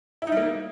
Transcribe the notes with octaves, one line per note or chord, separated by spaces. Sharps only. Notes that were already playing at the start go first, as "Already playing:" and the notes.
E4
D#4
G3
A#3